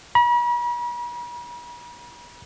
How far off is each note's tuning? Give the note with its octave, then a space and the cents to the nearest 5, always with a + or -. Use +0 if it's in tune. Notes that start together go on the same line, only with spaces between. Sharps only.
B5 -45